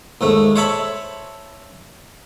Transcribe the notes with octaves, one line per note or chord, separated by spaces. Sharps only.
D#2 G#2 A3
C5 C#5 E5 A5 B5